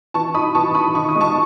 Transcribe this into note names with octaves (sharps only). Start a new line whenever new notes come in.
E3 A5 C#6
D#4 B5 D#6
E3 A5 C#6
E3 B5 D#6
D#3 C#6
D#6
G#3
A5 C#6